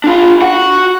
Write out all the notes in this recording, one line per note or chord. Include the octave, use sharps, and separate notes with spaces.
D4 F4
F#4 F#5